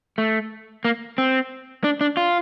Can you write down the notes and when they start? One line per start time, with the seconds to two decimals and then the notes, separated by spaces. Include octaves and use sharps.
0.18 A3
0.85 A#3
1.18 C4
1.84 D4
2.01 D4
2.17 F4